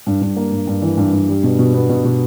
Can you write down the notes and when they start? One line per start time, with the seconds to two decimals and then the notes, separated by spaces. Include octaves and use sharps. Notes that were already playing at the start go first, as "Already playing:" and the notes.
0.07 G2
0.21 G2
0.36 A#3
0.52 G2
0.67 G2
0.82 E3
0.97 G2
1.13 G2
1.28 G3
1.43 B2
1.59 B2
1.74 B3
1.89 B2
2.05 B2